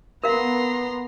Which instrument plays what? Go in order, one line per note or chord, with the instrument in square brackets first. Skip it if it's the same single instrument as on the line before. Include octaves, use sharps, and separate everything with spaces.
[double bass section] B3 [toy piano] A#4 F5 [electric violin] A#5 C6